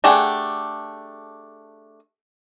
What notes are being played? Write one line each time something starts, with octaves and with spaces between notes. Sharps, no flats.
A3 D4 G4 G#4 F#5